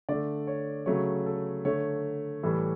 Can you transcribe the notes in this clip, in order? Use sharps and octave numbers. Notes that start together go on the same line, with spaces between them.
D3 A3 D5
C#5
C#3 F#3 A3 C#5
A4
D3 A3 C#5
A2 E3 G3